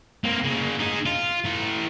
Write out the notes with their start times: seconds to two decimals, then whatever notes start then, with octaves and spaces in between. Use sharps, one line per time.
0.24 A#3 C4
0.44 C#3 A#3
0.79 D#4 G#4
1.06 F4
1.44 E3 A#5